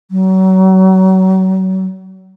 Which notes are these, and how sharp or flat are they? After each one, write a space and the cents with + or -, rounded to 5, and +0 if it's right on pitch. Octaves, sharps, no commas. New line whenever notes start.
F#3 +30